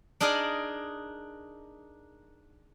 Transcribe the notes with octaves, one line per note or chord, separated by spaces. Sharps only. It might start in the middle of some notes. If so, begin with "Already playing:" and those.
D4 D#4 G#4 A#4 D5 D#5